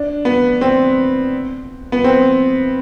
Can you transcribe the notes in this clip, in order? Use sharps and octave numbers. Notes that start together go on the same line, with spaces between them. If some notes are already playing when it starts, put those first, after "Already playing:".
Already playing: D4
B3
C4
B3
C4